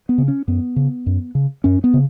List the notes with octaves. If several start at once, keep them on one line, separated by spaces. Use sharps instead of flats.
B3
C#3
C#4
F#2 B3
C#3
F#2
C#3
F#2 C#4
B3
C#3